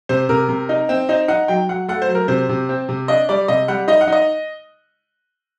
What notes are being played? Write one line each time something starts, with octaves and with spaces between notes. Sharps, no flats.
C3 C5
C3 A#4
C3
D#4
C4
D#4 C5
D#4 F#5
F#3 G5
F#3 F#5
A3 F#5
C5
F#3
A#4
C3 C5
C3
C4
C3
D4 D#5
G3 D5
C3 D#5
G3 F#5
D#4 D#5
F#5
D#4 D#5